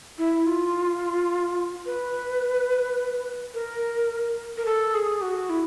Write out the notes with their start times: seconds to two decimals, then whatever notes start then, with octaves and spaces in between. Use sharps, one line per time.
0.18 E4
0.46 F4
1.86 B4
3.54 A#4
4.57 A#4
4.66 A4
4.94 G#4
5.22 F#4
5.50 E4